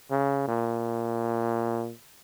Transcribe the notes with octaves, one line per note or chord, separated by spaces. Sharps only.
C#3
A#2